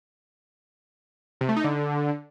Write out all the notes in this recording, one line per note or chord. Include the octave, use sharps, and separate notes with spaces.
C3
A3
D#4
D3